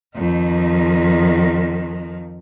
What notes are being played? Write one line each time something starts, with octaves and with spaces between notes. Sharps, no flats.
F2 D#3